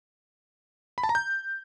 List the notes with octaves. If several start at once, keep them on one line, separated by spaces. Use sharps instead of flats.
B5
A5
A#5
G6